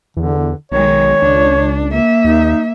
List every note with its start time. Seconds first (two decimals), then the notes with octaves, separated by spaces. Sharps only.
0.17 E2 D3
0.72 B1 D#3 G#3 C#5
1.22 C#2 D4
1.91 A#3 E5
2.25 D#2 D#4